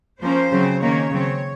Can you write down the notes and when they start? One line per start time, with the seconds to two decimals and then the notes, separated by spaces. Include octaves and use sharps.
0.21 F3 A#3 C#4 C5
0.51 C#3 F#3 C4
0.81 D#3 A#3 C#4 C#5
1.11 C#3 F#3 C4